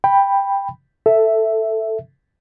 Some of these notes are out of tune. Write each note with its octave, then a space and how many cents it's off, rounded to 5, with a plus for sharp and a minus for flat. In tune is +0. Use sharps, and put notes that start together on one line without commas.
G5 +15 B5 +0
A4 +5 E5 +0